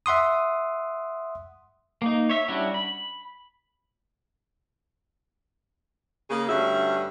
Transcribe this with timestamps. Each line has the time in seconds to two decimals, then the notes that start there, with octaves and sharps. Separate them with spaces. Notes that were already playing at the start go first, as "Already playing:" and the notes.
0.06 E5 F#5 C6 D#6
2.02 A#3 D#4
2.29 C#5 E5
2.48 G3 C#4 D4 E4 F#4
2.74 B5
6.30 C#3 A#3 C#4 G#4
6.49 G2 D3 A3 C#4 F#4 E5